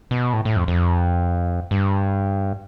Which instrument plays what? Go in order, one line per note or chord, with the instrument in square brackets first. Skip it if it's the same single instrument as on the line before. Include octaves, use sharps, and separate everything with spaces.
[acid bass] B2
A2
A2
F2
F2
G2